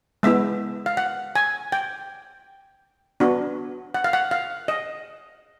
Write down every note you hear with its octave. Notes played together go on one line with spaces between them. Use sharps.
G#3 B3 E4 E5
F5
F#5
G#5
G5
B3 D4 F#4
F#5
F5
F#5
F5
D#5